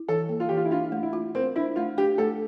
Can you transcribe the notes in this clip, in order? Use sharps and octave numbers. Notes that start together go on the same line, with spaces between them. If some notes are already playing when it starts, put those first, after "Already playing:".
Already playing: E4
E3 A4
A#3
F4
E3 G4
F4
E4
D4 F4
A3
E4
F4
C4 A#4
D4 E4
A3 F4
D4 G4
A3 A4